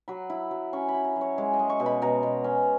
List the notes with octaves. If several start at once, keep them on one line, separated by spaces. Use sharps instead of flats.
F#3 B5
E4
F#3
C#4 C#6
B5
E4
A#5
F#3
C#5
G#3 C#5
D#5
G#3
C#6
B2
B5
B2 A#5
B2
C#4